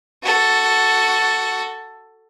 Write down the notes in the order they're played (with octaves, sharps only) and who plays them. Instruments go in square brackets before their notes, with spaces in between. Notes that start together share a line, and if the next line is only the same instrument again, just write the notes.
[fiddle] F#4 A4